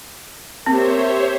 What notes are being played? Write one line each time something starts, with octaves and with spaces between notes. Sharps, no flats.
A#3 C4 G4 C5 C#5 E5
G4